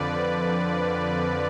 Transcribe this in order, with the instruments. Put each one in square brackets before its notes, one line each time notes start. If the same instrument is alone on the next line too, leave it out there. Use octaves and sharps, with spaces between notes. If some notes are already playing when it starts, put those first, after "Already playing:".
Already playing: [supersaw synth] F2 D3 F3 B4 D5